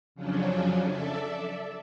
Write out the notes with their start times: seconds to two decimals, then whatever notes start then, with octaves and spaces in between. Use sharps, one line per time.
0.15 F2 C#3 F3 F#3 C#4 D4
0.85 A4 D5 E5